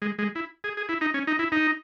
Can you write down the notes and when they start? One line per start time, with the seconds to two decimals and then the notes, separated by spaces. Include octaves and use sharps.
0.02 G#3
0.19 G#3
0.35 E4
0.64 G#4
0.77 G#4
0.89 E4
1.01 D#4
1.14 C#4
1.27 D#4
1.39 E4
1.52 D#4